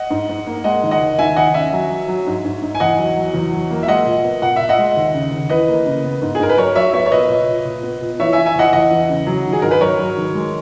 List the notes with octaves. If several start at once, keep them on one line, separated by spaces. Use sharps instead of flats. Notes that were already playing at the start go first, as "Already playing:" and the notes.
Already playing: D#5 F#5
G#2
G#2
A#3
G#3 D#5 F#5
D#3
D#5 F#5
D#2
D#3 E5 G#5
D#2 D#5 F#5
C#4 E5 G#5
F#3
F#3
F#3
G#2
G#2
G#2
G#5
E2 D#5 F#5
F#3
F#3
E2
F#3
A#3
E5
G#3 D#5 F#5
A#2
B3
A#2 F#5
A#2 E5
D#5 F#5
G#3
D#2
C#3
D#2
E3 B4 D#5
A#3
C#3
B3
G#2
G#4
G#2 A#4
B4
F#3 A#4 C#5
F#3 C#5 E5
B3 C#5 E5
C#5
A#2 B4 D#5
A#2
A#2
A#2
B3
A#2
E3 C#5 E5
E5 G#5
E3
E5 G#5
E2 D#5 F#5
E2 D#5 F#5
E3
C#3
F#3
D#3
G#4
G#2 A#4
B4
F#3 A#4 C#5
F#3
D#3
G#3